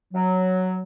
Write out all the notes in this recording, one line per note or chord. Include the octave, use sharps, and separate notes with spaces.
F#3